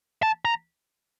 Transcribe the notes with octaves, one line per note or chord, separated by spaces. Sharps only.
A5
A#5